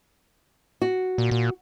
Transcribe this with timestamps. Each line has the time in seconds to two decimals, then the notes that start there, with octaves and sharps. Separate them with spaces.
0.81 F#4
1.18 A#2
1.31 A#2